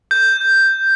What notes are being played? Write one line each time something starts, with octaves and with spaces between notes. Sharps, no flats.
G6